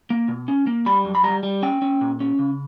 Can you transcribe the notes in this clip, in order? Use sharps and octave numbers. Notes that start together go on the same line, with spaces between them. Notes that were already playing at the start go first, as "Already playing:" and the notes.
A#3
B2
C#4
A#3
G3 B5
F#2
B5
G3 A#5
G3
C#4 G5
C#4
A#2
C#4
C#3